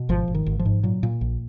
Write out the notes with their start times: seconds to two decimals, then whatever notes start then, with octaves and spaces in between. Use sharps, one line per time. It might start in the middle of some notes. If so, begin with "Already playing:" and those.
Already playing: B2
0.09 G#1 F3
0.28 G#1
0.35 D#3
0.46 G#1
0.59 F3
0.65 G#2
0.83 A#2 F#3
1.03 A#2
1.21 A#1